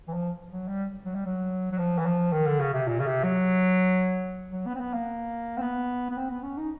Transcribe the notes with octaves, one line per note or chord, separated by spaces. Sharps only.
E3
F3
F#3
G3
F#3
G3
F#3
F#3
F3
E3
F3
D#3
D3
C#3
C3
A#2
C#3
C3
F#3
F#3
B3
C4
B3
A#3
C4
B3
B3
C4
B3
C#4
D#4